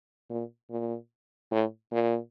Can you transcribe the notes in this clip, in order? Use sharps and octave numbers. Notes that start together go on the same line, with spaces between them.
A#2
A#2
A2
A#2